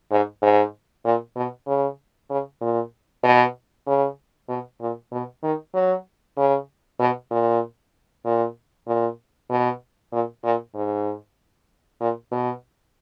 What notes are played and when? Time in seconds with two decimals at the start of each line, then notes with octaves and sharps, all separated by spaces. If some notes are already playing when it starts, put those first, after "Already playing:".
0.11 G#2
0.42 G#2
1.05 A#2
1.36 B2
1.67 C#3
2.30 C#3
2.61 A#2
3.24 B2
3.87 C#3
4.49 B2
4.81 A#2
5.12 B2
5.43 D#3
5.74 F#3
6.37 C#3
7.00 B2
7.31 A#2
8.25 A#2
8.87 A#2
9.50 B2
10.12 A#2
10.44 A#2
10.75 G#2
12.00 A#2
12.31 B2